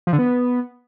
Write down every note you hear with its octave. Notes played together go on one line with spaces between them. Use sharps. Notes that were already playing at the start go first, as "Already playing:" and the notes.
F3
D3
B3